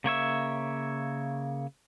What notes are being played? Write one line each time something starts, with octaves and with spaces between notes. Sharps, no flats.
C#3 A#3 C#5 E5